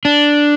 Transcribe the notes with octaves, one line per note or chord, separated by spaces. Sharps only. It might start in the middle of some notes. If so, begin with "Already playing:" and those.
D4